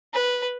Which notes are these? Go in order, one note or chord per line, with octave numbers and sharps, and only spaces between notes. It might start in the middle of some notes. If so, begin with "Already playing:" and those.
B4